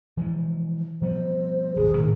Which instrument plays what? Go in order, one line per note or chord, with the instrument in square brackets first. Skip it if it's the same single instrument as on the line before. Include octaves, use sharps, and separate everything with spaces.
[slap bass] E3 F3 G#3
[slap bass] F3 G3 B3 [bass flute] C5
[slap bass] D#1 G#1 G2 [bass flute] G#4
[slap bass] A2 [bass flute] D#3